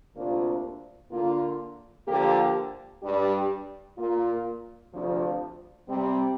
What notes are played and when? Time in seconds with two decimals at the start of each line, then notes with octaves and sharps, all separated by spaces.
0.15 D2 C3 A#3 D4 F4
1.11 D3 A#3 F4
2.06 D3 F3 A#3 G4
3.02 G2 G3 D4 G4
3.97 A#2 A#3 F4
4.92 D2 C3 F3 D4 F4
5.87 C3 G3 C4